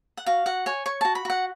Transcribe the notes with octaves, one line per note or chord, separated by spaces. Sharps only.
F#5
F#4 F5
F#4 F#5
C#5 G#5
C#5 C#6
F#4 A5
B5
F#4 F#5